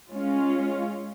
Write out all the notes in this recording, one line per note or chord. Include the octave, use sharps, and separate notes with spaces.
G#3 C#4 F4